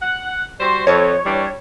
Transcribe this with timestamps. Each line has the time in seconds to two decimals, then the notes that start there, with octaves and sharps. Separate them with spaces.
0.01 F#5
0.60 G3 F#4 C5
0.87 F2 C#5
1.25 E3 G3 D4